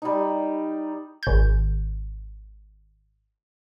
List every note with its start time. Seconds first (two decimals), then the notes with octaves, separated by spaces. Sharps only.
0.02 G3 D#4
1.23 G#1 G6